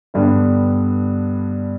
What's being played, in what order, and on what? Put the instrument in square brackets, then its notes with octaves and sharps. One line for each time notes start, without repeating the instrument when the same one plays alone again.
[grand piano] G2 D3 G3 B3 D4